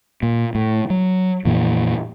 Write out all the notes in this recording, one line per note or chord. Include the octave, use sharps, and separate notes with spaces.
A#2
A2
F#3
F2 A#2 E3